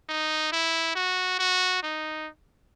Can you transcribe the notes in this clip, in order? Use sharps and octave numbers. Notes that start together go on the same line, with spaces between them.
D#4
E4
F#4
F#4
D#4